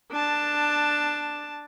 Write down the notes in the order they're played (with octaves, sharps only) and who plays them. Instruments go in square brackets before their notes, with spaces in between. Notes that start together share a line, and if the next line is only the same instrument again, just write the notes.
[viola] D4 A5